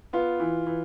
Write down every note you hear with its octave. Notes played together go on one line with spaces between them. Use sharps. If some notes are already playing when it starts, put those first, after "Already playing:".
B3 F4
E3
E3